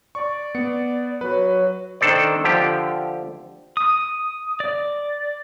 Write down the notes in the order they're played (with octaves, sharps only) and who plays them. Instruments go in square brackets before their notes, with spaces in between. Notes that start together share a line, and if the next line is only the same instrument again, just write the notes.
[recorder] D5 [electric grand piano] C#6
[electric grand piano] B3 C#7
[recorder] F#3 [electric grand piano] B4
[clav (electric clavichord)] D#3 D4 A4 C5 D5
D3 F3 G4
[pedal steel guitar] D#6
D5